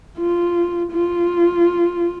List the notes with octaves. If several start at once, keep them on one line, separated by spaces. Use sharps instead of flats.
F4
F4